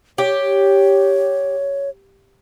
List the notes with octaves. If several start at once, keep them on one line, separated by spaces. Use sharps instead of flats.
G4 C#5